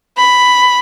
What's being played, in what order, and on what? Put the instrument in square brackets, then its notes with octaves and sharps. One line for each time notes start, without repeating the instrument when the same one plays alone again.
[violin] B5